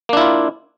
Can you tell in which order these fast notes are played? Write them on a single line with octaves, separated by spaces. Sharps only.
A#3 D4 E4 F4